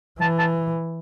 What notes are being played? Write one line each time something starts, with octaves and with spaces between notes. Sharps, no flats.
E3 A5
A5